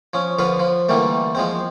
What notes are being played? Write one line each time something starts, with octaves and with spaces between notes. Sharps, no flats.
F3 C#4
D3 F3 B4 F5
F3
D3 E3 G3 A3 A#3
F3 G#3 C4